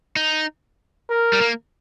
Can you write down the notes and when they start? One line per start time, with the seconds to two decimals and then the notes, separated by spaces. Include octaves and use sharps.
0.16 D#4
1.10 A#4
1.33 G3
1.41 A#3